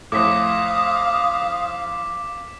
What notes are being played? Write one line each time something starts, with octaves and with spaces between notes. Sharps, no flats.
F2 A2 F5 D6 D#6 B6